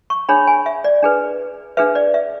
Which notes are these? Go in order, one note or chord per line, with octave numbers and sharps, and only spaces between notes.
C#6
D4 G#4 C#5 B5
G#5
E5
D5
D4 G#4 B4
D4 G#4 B4 E5
D5
E5